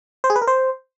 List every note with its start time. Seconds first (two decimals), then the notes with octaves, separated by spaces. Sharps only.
0.24 C5
0.30 G#4
0.36 B4
0.42 A#4
0.47 C5